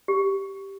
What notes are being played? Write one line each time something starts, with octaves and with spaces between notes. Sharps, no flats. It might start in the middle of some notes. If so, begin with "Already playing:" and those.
G4